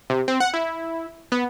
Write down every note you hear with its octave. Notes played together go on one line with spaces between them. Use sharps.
C3
C4
F#5
E4
B3